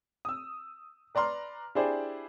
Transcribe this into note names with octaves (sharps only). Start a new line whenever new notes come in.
D#6 E6
B4 D5 A#5 C6 F6
D4 E4 G4 G#4 C5 D5